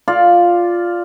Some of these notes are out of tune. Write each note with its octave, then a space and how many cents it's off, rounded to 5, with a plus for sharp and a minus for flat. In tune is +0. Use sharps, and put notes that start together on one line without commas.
F4 +0 D5 +0